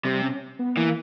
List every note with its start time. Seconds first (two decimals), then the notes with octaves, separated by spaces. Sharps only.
0.04 C3 G3
0.22 C#4
0.59 B3
0.76 E3 A#3